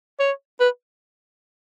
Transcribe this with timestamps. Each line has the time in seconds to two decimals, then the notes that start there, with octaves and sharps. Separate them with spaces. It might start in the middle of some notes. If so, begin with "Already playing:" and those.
0.20 C#5
0.60 B4